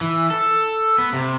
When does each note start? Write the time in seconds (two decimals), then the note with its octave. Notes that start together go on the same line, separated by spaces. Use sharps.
0.01 E3
0.30 A4
0.98 B3
1.13 C3